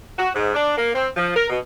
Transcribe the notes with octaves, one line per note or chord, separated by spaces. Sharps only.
F#4
G#2
D4
A#3
C4
F3
A#4
B2